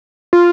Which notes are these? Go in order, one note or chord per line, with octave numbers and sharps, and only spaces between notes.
F4